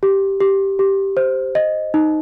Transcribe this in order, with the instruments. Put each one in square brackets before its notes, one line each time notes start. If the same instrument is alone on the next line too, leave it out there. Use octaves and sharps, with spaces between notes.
[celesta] G4
G4
G4
C5
D#5
D#4